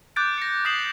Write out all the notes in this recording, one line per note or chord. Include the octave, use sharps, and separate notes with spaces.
D6 F#6 G6 A6 D7
A#6 C#7
D6 D#6 B6 C7 E7 F#7